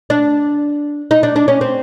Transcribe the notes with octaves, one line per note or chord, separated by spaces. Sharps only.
D4
D#4
D4
D4
C#4
C4